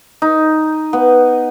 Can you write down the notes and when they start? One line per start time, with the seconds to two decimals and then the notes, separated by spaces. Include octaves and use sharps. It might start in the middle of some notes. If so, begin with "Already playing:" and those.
0.22 D#4
0.93 B3